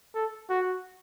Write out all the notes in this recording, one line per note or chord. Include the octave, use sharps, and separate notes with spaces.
A4
F#4